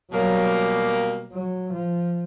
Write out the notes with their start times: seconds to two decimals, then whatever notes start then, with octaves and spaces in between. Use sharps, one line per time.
0.11 B2 F#3 G3 A#3
1.33 F#3
1.73 F3